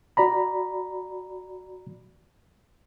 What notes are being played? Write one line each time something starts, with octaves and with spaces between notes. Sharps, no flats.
F#4 D5 A#5 B5